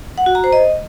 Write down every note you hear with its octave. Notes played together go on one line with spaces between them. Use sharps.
F#5
F#4
A#5
C5
D#5